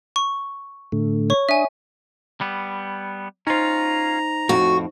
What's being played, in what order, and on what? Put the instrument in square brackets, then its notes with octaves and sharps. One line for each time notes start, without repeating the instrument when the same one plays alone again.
[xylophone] C#6
[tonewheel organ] A2 D3 A3
[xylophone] C#5 C#6
[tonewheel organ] D4 D#6 [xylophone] E5 G#5
[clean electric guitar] G3 B3
[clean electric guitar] C#4 F4 [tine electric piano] D#4 C5 [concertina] A#5
[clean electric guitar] F2 A2 [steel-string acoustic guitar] F#4